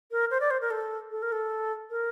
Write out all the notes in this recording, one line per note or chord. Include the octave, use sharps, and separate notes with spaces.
A#4
C5
D5
C5
A#4
A4
A4
A#4
A4
A#4